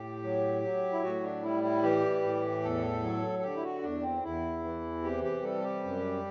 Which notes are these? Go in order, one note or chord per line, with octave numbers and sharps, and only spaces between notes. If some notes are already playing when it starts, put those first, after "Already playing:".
Already playing: A2 G4
F#3
F#3
E4
A2 F#4
D4
G3 E4
E4
E3 G4
A2
E2 A4
F#3
A4
D3 G4
E4
F#4
E2 D4
C4
E2 E4
E3
C3 G4
G4
G3 A4
G4
F#2